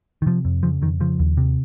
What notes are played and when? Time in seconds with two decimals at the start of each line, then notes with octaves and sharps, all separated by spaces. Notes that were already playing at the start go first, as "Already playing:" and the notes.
0.22 D#3
0.26 C3 F3
0.45 F2
0.63 C#3 F3
0.82 F2 D#3
1.00 C#3 F3
1.19 D#2
1.37 C3